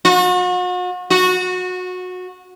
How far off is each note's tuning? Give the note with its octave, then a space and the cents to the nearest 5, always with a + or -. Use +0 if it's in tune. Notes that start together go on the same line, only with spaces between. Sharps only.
F#4 -40
F#4 -20